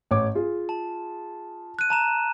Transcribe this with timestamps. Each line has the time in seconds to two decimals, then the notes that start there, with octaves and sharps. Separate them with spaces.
0.11 A1 C#5 D6
0.35 F4 G#4
0.69 A5
1.79 F#6 D#7
1.90 A5 A#5 E7